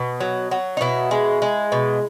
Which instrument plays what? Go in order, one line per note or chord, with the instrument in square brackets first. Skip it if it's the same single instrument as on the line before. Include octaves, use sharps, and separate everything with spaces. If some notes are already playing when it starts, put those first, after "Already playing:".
Already playing: [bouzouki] B2
F#3
F#3
D#4
B2 E4
G#3
G#3
B2